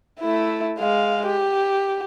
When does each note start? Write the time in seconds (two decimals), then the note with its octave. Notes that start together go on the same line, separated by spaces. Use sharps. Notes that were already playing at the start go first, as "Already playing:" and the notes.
0.20 A3 E4
0.79 G#3 F5
1.26 G4